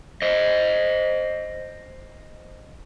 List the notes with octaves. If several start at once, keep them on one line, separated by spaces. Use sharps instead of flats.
C5 D#5